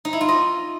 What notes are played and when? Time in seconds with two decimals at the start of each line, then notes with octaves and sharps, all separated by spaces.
0.05 D#4
0.13 E4
0.21 F4
0.29 D#5